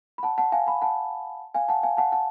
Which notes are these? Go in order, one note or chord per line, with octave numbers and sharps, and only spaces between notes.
B5
F#5 A5
F#5 A5
F5 G#5
G#5 B5
F#5 A5
F5 G#5
F#5 A5
F5 G#5
F#5 A5
F#5 A5